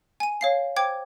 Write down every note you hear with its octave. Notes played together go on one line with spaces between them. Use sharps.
G#5 D#7
C#5 F5 C7
C5 G5 D6 G#6